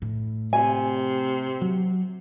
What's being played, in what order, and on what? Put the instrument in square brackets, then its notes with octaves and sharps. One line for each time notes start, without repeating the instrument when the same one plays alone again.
[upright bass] A2
[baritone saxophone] C3 [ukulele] G#5
[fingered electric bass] F#3